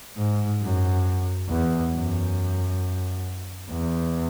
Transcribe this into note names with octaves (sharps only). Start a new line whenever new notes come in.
G#2
F#2
E2
F#2
E2